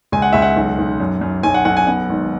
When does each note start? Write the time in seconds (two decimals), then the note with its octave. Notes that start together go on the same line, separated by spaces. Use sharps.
0.12 C#2 G#5
0.22 F#5
0.33 C#2 E5
0.42 F#5
0.56 B1
0.78 B1
1.00 F#2
1.21 F#2
1.43 B1 G#5
1.54 F#5
1.65 B1 F#5
1.77 G#5
1.87 B3 F#5
2.09 G#1